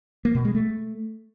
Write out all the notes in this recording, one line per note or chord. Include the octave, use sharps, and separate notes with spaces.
A#3
B2
G#3
A3